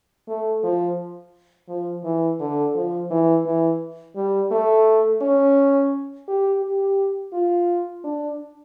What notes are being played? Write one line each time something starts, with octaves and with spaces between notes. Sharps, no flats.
A3
F3
F3
E3
D3
F3
E3
E3
G3
A3
C#4
G4
G4
F4
D4